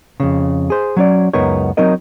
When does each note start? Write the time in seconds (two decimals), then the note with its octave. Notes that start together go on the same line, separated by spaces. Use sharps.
0.20 F2 C#3
0.70 G#4 C5
0.97 F#3 C#4 D5
1.33 C#2 F#2 B3 D#4 A#4 C#5
1.77 F#3 C4 D#4 A#4 D#5